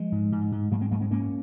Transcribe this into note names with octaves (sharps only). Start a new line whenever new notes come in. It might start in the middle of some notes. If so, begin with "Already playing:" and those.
Already playing: F3 G#3
G#2
G#2
G#2
G#2 F#3 A#3
G#3 C4
G#2 F#3 A#3
G#3 C4
G#2 A#3 C#4